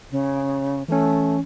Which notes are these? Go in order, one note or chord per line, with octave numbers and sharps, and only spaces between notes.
C#3
E3 A3 C#4